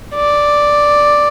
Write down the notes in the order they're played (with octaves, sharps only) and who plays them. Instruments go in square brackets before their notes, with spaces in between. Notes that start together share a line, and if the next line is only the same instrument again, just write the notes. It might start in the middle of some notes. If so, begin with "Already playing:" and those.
[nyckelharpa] D5